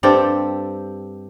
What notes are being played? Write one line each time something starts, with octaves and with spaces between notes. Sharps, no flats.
G2 C4 G4 A4